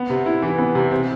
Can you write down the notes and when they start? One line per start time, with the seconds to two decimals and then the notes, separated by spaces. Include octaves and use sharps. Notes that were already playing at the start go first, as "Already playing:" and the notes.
Already playing: B3
0.10 C3
0.26 E4
0.42 E3
0.58 B3
0.75 C3
0.91 C4